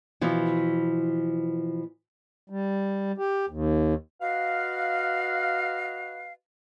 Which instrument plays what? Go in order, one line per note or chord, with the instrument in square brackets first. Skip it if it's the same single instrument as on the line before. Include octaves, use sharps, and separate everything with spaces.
[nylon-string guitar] B2 E3 F3
[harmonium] G3
G4
D#2
[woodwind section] F#4 B4 D#5 F5